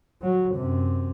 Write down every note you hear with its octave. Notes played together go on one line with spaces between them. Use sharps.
F#3
F#2 C3